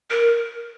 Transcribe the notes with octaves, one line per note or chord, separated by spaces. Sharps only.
A#4